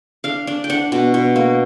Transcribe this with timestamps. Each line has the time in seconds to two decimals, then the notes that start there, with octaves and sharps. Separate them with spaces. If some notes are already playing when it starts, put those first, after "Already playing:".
0.24 D4 F5
0.47 D4
0.64 G5
0.70 D4 F#5
0.92 B2
1.14 B2
1.36 A#3